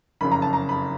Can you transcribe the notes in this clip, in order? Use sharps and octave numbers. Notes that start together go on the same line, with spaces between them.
F#1 F2 C#3 B5
A#5
A5
A#5
B5